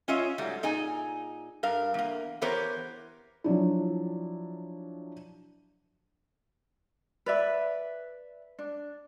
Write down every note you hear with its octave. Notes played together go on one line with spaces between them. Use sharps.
C#4 F4 C#5 D#5 E5
G#2 F#3 G3 A3
A#2 D#4 G#4 G#5
G2 A#4 F5
E2 A#3
E3 B3 G4 A#4 C5 C#5
F3 F#3 D4 E4
B4 D5 E5
D4